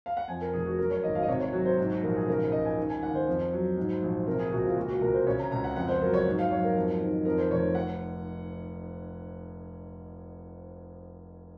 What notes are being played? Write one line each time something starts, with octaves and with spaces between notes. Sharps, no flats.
F5
F#5
F2 G#5
A#4
F1 G#4
F#4
F#2 A#4
C#5
G#1 D#5
F5
D#5
C3 C#5
C#5
F#3 F#4
C5
G#2
F#4
A#1 A#4
G#4
C#3 A#4
C#2 D#5
G#5
D#3
G#5
D#2 F#5
C5
F2
F#3
G#2
A#1
C3 A#4
G#4
C#2 F#4
F4
A#2 F#4
F#4
C2 A#4
C5
C#3 C#5
A#5
C#2 A#5
F#5
F2 F#5
C5
F#3 A#4
C#5
G#2
F5
F#3 C#5
A#4
F2
D#3
F2 A#4
C5
F1 C#5
F#5